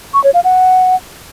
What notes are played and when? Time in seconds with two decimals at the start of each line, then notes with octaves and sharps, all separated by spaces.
0.14 C#6
0.24 C#5
0.34 F5
0.44 F#5